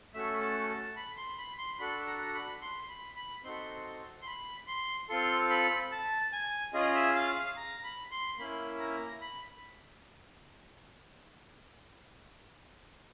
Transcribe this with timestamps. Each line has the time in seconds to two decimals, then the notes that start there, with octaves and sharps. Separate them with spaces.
0.14 A3 C#4 F#4 A4 E5
0.41 A5
0.69 A5
0.96 B5
1.17 C6
1.38 B5
1.58 C6
1.79 D4 F#4 A4 B5
2.07 A#5
2.34 B5
2.62 C6
2.88 B5
3.16 B5
3.43 C4 D#4 F#4 A4 C6
4.22 C6
4.26 B5
4.68 C6
5.09 C4 F4 A4 C6
5.50 B5
5.92 A5
6.33 G#5
6.74 C#4 F4 G#4 D#5
6.94 E5
7.15 F5
7.36 F5
7.57 A#5
7.84 B5
8.11 C6
8.39 A#3 C#4 E4 B5
8.80 A#5
9.21 B5